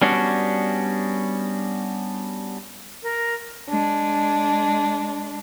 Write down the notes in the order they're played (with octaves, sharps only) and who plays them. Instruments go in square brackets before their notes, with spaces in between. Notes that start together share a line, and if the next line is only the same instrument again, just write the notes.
[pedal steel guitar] G3 B3 C#4 D4 F#4
[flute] A#4
[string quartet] G#3 D4